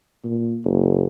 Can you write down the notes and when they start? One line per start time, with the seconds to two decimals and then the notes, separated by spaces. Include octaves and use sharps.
0.24 A#2
0.64 F#1